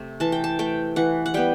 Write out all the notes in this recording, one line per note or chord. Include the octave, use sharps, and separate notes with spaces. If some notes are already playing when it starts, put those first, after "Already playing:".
Already playing: C3 A3
E3 A5
G5
A5
A3 G5
E3 F#5
F#5
G3 B3 G5